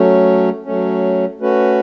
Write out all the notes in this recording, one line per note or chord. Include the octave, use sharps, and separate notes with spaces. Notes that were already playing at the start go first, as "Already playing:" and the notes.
Already playing: F#3 A3 C#4
F#3 A3 C#4
A3 C#4 F#4 B4